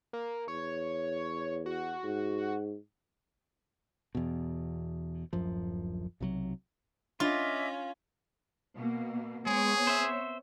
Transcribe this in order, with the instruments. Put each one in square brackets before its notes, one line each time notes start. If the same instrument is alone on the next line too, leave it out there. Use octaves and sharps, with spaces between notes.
[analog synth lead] A#3
[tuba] E2 [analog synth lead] C#5
[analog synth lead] F#4
[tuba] G#2
[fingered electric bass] E2 B2
D1 F#2 F3
B1 C3 D#3 F#3
[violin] C#4 [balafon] D4 [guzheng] F4 [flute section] D#5 E5 D6
[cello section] B2 A#3
[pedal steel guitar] G#3 [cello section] B3 C4 C#5 [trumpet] G#4
[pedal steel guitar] C5 E5